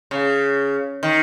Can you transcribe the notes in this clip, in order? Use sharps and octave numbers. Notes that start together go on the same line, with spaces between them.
C#3
D#3